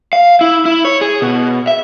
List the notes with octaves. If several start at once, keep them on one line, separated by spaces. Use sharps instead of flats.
F5
E4
E4
C#5
G#4
B2
E5